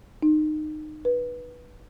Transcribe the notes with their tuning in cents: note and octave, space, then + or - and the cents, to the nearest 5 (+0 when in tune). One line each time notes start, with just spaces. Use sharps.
D#4 -25
B4 -15